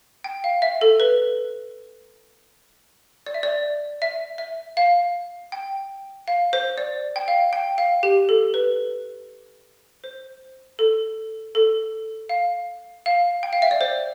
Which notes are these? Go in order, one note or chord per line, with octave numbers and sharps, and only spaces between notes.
G5
F5
E5
A4
B4
D5
E5
D5
E5
E5
F5
G5
F5
C5
D5
G5
F5
G5
F5
G4
A4
B4
C5
A4
A4
F5
F5
G5
F5
E5
D5
C5